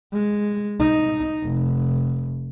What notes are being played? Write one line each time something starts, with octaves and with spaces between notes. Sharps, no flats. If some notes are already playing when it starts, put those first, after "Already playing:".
G#3
D#4
F1